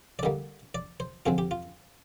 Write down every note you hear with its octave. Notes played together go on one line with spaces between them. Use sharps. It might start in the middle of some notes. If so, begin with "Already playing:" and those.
D5
D3 G3 A#3 D#5
D5
C5
F2 D3 G#3 C4 F4
G4
F4